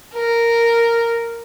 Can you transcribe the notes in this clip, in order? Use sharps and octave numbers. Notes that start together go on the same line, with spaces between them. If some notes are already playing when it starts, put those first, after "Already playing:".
A#4